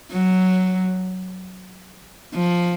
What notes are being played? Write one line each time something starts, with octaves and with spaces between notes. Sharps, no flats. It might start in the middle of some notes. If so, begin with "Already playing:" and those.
F#3
F3